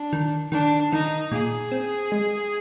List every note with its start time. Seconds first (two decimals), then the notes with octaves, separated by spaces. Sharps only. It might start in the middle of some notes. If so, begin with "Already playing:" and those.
Already playing: D4
0.13 D#3
0.52 D#3 D4
0.92 D#3 D#4
1.31 A#2 G#4
1.72 C4
2.12 G#3